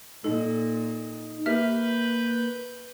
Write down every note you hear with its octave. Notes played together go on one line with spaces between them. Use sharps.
A#2 D#4 A4
A#3 G4 B4 E5 F6 G6